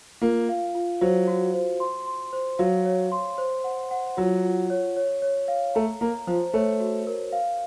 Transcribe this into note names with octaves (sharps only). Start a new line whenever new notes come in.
A#3 F4
F5
F4
F#3 C5
F#4
C5
C6
C6
C5
F#3 F5
C#5
C6
C5
F#5
F#5
F#3 F4
F4
C#5
C#5
C#5
F5
A3 A#5
A#3 A#5
F3 C5
A3 C#5
F#4
A#4
F5